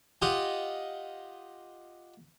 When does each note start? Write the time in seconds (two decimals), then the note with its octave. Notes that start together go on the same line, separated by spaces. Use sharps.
0.22 F4 G4 D#5 F#5